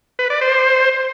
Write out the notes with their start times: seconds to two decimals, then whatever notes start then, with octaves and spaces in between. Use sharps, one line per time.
0.19 B4
0.30 D5
0.41 C5